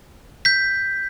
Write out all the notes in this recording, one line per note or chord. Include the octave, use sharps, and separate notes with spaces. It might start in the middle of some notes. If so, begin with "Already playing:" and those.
G6 B6